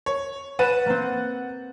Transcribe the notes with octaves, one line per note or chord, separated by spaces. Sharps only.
C#5
B4 F#5 A6 D#7 E7
A#3 C4